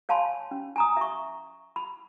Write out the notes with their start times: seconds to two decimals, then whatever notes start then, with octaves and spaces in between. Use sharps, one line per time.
0.09 C#5 F5 G#5 A5 B5 C6
0.51 C#4
0.76 G#5 A#5 D#6
0.97 E5 C#6
1.76 B5